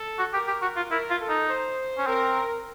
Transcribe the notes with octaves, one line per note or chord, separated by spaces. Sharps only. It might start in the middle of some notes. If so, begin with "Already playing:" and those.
Already playing: A4
F#4
G4 A#4
G4
F#4
F4
E4 A#4
F4
A4
D#4
C5
C#4
C4 A#4